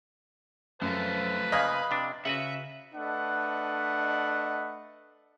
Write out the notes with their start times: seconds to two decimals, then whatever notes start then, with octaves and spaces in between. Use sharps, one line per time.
0.82 F#2 F3 A3 B4
1.52 C#3 F3 A#3 D#5 F5 B5 G#6
1.91 C3 D4
2.25 C#3 F#4 B4 E5 F#5
2.95 A3 D4 B4 D#5 F#5